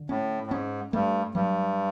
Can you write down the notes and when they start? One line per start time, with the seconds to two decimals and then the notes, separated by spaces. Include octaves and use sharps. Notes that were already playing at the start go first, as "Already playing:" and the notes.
Already playing: D3
0.09 A2 C#4
0.47 A2
0.51 G#2 C#4
0.93 G2 A3
1.35 G2 F#3